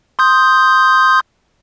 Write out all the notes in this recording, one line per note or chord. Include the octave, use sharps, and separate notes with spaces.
C6 D#6 G6